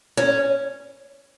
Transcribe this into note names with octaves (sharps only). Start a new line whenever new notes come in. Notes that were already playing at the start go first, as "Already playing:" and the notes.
C#4